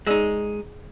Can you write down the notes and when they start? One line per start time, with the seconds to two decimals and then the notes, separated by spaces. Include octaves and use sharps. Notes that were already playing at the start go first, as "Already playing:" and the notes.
0.07 G#3 D#4 G#4 D5